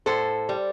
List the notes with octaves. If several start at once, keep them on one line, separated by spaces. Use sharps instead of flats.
A2 A4 C5
G3